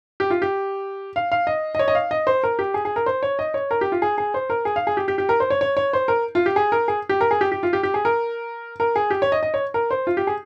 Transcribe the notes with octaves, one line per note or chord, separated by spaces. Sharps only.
G4
F4
G4
F5
F5
D#5
D#5
C#5
D#5
F5
D#5
C5
A#4
G4
G#4
G#4
A#4
C5
C#5
D#5
C#5
A#4
G4
F4
G#4
G#4
C5
A#4
G#4
F5
G#4
G4
G4
G4
A#4
C5
C#5
C#5
C#5
C5
A#4
F4
G4
G#4
A#4
G#4
G4
A#4
G#4
G4
G4
F4
G4
G4
G#4
A#4
A#4
G#4
G4
C#5
D#5
D#5
C#5
A#4
C5
F4
G4
G#4